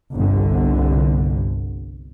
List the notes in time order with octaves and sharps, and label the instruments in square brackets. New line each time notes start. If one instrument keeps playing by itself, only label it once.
[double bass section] G1 C2 D3